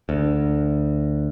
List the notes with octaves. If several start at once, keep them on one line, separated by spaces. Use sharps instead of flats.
D2